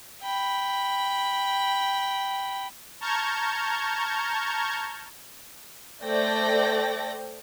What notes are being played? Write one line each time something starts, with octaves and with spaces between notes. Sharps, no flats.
G5 B5
A5 A#5 C#6 F6 G6 G#6
A3 A4 C5 D5 G5 A#6